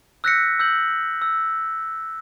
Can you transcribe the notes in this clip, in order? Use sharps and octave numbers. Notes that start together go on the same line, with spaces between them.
E6 F#6 G6 A#6 B6 C#7
E6 G6 F#7
E6